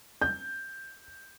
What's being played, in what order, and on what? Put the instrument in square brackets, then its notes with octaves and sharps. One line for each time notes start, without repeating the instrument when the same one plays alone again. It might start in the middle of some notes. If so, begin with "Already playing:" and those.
[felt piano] G6